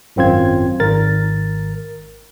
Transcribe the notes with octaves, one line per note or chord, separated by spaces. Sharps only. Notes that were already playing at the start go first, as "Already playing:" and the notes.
G#1 F#2 C4 F4 G#6
G#1 A#4 A6